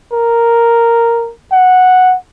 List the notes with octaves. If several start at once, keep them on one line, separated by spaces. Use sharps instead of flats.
A#4
F#5